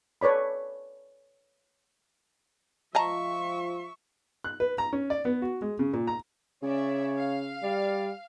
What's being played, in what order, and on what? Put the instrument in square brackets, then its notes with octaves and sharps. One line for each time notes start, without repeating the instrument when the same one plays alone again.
[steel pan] A4 B4 C#5 D5 B5
[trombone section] F3 F4 [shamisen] D#5 A5 A#5 [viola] E5 C#6
[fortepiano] F#6
B4
A#5
C#4
D5
B3
F#4
G#3
C#3
A#2
A#5
[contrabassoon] C#3 [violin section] C#4 D5 E5 [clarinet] C#5
[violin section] F5 F6
[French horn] G3 [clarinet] D5